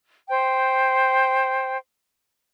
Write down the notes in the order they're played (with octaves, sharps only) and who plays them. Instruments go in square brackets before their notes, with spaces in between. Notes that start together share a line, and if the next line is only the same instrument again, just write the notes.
[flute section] C5 G5